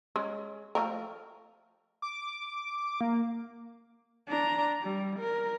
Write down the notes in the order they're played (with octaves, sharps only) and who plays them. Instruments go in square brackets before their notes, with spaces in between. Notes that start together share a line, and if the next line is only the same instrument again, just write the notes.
[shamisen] G#3 C#4
F3 A3 A#4
[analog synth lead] D6
A#3
[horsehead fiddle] D4 A#5
G3
A#4